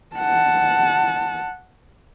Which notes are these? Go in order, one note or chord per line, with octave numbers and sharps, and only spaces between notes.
F#5 A5